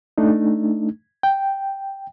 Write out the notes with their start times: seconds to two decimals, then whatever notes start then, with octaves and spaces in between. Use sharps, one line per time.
0.18 A3 D4 D#4
1.23 G5